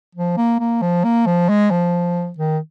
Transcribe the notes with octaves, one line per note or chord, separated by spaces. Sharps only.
F3
A#3
A#3
F3
A#3
F3
G#3
F3
D#3